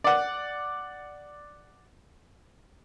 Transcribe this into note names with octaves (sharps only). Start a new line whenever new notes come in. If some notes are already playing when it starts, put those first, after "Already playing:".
D5 F#5